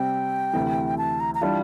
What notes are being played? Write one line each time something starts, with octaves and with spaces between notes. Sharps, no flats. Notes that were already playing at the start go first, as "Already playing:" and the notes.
Already playing: C3 G3 C4 G5
D2 C3 E3
A5
A#5
A#5
E3 G3 D4 F4 A5